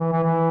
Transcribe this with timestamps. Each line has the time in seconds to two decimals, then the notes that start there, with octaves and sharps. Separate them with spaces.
0.01 E3
0.12 E3
0.24 E3